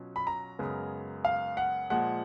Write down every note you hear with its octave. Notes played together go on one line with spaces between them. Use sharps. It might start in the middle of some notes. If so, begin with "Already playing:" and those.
Already playing: B2 F#3 C#4 F4
B5
A#5
F#2 C#3 G#3 B3
F5
F#5
A#2 F3 G#3 F#5